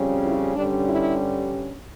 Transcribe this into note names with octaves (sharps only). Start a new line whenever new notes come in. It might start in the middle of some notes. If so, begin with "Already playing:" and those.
Already playing: F2 C#3 G3 C#4
E4
G2 D3 G3 C#4 D4
E4